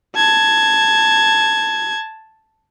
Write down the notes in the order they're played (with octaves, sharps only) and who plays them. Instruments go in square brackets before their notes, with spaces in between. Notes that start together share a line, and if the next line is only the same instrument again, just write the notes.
[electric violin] A5 G#6